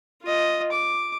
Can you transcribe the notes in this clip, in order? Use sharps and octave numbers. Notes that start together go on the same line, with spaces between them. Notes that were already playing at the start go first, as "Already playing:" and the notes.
F4 D#5
D6